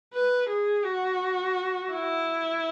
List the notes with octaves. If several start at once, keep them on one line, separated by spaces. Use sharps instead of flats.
B4
G#4
F#4
E4